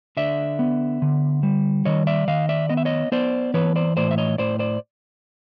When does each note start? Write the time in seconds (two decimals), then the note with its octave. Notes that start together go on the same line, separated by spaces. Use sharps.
0.17 D3 D5 E5
0.59 B3
1.02 D3
1.43 G3
1.85 D#3 C#5 D#5
2.07 D5 E5
2.28 D#3 D#5 F5
2.49 D5 E5
2.69 B3 D#5
2.77 E5
2.85 C#5 D#5
3.12 B3 C5 D5
3.54 E3 B4 C#5
3.76 C5 D5
3.97 A2 C5 D5
4.11 E5
4.18 C#5 D#5
4.38 A2 C5 D5
4.59 C5 D5